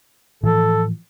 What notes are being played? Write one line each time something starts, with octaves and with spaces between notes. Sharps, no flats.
A2 E3 F3 A4